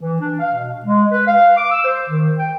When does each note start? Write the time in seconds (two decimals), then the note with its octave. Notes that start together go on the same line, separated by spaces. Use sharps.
0.01 E3
0.20 D4
0.39 F5
0.54 B2
0.85 G#3
1.11 B4
1.27 F5
1.57 D6
1.71 E6
1.84 C5
2.09 D#3
2.39 G5